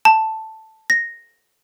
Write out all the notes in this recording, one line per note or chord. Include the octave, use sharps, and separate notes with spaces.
A5
A#6